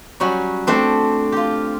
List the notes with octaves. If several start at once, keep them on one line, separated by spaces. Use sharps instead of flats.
F#3 G3 C#4 F#4
A3 C4 D4
F4 G4